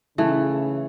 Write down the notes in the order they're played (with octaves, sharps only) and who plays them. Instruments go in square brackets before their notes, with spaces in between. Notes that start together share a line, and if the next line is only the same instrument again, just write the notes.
[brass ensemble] C#3 [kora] E3 A3